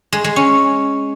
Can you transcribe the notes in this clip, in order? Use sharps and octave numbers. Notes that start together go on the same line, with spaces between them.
G#3
G#3
C#4